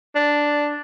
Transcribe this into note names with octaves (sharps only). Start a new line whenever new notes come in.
D4